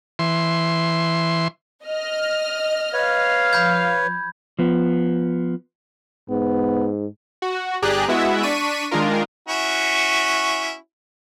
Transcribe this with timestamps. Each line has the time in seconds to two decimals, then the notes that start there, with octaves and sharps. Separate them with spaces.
0.19 E3 C6
1.85 D#5 F6
2.93 B4 C#5 F5
3.53 F3 B5 G6 G#6
4.59 F3 B3
6.30 G#2 B3
7.42 F#4
7.82 G1 G4 G#4 D5 A#5 F#6
8.08 G#3 B3 E4 F#4 E5 F#5
8.43 D4 C#6 B6 D#7
8.91 D#3 G#3 D4 F4 A#4
9.48 C#4 E4 F#4